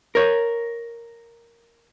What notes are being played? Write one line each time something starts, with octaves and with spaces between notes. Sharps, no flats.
A#4 C#5